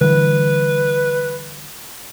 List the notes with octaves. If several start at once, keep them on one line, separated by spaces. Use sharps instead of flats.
D3 E3 G3 B4